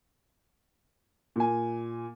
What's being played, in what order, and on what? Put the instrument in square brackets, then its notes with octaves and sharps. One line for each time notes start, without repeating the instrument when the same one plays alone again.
[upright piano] A#2 G#5